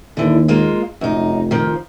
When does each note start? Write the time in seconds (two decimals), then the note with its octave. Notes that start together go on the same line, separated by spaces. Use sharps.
0.17 D#2 D3 E3
0.48 G#3 A#3 F4
1.01 F1 F#2 D#4
1.51 D#3 F3